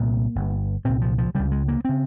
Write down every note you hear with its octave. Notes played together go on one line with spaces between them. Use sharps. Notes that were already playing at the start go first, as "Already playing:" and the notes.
Already playing: C2 A#2 A#3
G1 G2
C2 A#2 C4
F3
F3
C#2 C#3 G3
G#3
A#3
C#3 C4